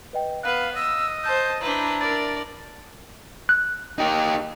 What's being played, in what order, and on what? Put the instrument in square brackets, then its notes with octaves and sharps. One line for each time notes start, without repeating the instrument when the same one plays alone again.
[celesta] B4 D#5 G5
[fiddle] B3 B4 [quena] F5 [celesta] F#6
[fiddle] D#5 [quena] E6
[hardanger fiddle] C5 A5 [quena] G6
[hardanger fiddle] D4 E4 [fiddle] B4 C5 [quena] A#5
[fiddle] A#4 D5 [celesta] A6
[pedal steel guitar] F#6
[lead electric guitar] D#4 G4